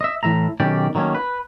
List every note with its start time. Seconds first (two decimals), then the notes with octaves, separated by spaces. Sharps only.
0.01 D#5 E5
0.23 A2 E3 A3 E5 A#5
0.60 B1 D#3 C#4 G4 D5
0.95 D#3 F#3 A3 A#3 C#4
1.15 B4